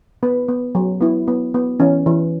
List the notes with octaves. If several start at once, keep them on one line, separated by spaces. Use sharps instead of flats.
B3 B4
B3
F#3
B3 E4
B3
B3
E3 C#4
E3